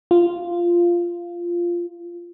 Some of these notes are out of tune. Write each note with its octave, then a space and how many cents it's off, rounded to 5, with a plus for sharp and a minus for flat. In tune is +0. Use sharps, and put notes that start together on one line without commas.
F4 -10